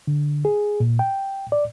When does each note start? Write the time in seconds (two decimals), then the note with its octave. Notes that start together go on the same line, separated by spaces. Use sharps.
0.07 D3
0.45 G#4
0.80 A#2
0.99 G5
1.52 D5